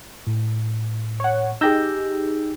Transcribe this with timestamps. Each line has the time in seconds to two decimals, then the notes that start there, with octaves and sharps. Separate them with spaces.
0.27 A2
1.20 C#5 F#5
1.61 D#4 G4 G#4 E6 G6 A#6